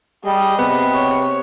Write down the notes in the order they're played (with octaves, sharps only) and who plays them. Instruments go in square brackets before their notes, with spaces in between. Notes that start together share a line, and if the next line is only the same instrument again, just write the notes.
[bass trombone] G3 [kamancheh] G#4 D#5
[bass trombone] C3 [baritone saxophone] B3
[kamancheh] C#5